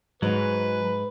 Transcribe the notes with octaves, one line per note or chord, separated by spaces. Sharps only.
G#2 F#3 B4